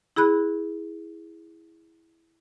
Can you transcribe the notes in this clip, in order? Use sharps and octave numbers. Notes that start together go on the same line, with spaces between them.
E4 G#4 B5 F#6